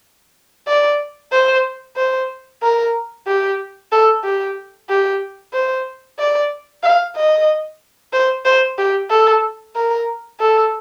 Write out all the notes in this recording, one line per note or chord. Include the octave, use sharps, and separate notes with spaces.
D5
C5
C5
A#4
G4
A4
G4
G4
C5
D5
F5
D#5
C5
C5
G4
A4
A#4
A4